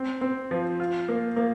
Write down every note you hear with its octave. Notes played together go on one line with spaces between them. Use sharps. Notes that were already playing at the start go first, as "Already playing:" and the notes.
Already playing: C4
C4
F3
F4
A#3
A#3